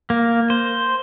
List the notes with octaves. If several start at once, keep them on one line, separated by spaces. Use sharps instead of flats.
A#3
C5